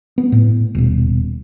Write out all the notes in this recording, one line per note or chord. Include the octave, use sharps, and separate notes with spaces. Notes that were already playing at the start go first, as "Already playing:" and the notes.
B3
A2
D#1 B2